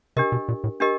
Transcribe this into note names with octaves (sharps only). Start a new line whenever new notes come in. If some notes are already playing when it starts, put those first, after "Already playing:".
C3 D4 G4 A#4 D#5
B2
A#2
A2
D4 G4 A#4 D#5